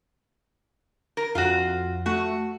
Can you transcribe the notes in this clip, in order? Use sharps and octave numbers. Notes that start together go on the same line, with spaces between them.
A#4
F2 F4 F#4
A3 F#4